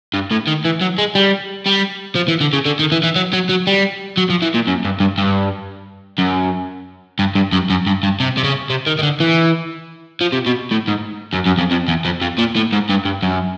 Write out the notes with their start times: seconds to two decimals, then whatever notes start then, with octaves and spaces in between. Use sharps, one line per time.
0.14 G2
0.32 A2
0.48 D#3
0.65 E3
0.81 F#3
0.98 G#3
1.15 G3
1.66 G3
2.16 F3
2.28 E3
2.40 D3
2.53 C#3
2.65 D3
2.79 D#3
2.92 E3
3.03 E3
3.16 F#3
3.33 F#3
3.49 F#3
3.67 G3
4.17 F#3
4.30 F3
4.42 E3
4.55 A#2
4.68 F#2
4.85 G2
5.00 G2
5.18 G2
6.19 F#2
7.19 G2
7.35 G2
7.52 F#2
7.70 F#2
7.87 G2
8.03 G2
8.20 C3
8.37 C3
8.44 C#3
8.70 C3
8.86 D#3
8.99 D#3
9.03 D3
9.20 E3
10.21 F3
10.33 C3
10.46 B2
10.72 A2
10.88 G#2
11.34 F#2
11.47 F#2
11.58 F2
11.71 F2
11.88 E2
12.05 F2
12.21 F2
12.38 A#2
12.56 A2
12.72 G#2
12.89 G2
13.05 G2
13.22 F#2